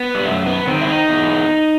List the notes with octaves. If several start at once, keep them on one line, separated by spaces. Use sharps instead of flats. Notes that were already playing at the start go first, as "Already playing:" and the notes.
Already playing: B3
G3
F#2 A3
B3
D#3 C4
E4
D#4
E2